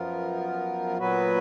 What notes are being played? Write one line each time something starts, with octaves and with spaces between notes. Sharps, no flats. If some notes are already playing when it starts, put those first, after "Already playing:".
Already playing: F#2 F3 B3 F4 A#4
A#2 F#3 B3 F#4 B4